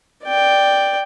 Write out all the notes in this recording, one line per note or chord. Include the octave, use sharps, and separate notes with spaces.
D5 G5